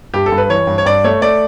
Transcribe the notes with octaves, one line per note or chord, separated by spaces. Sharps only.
G2 G4
A4
G2
B4
E3 C#5
G2
C#5
G2 D5
A3 C#5
A3 D5